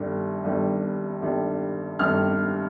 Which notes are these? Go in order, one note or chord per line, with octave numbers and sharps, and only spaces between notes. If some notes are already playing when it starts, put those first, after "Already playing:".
Already playing: G1 G2 D#3 G3
G1 G2 D#3 G3
G1 G2 D#3 G3
G1 G2 D#3 G3 F6